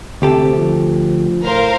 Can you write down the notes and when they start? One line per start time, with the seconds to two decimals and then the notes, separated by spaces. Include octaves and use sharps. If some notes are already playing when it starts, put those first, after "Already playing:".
0.22 D2 C3 G4 A4
0.54 F3
1.44 A2 A#4 C5 F5